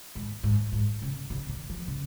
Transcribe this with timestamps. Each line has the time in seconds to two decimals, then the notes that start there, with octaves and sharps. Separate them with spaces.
0.15 G#2
0.43 G#2
0.72 G#2
1.02 C#3
1.30 C#3
1.49 D#3
1.69 F3
1.87 C#3